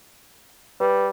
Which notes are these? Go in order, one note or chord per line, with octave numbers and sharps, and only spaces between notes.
G3 B4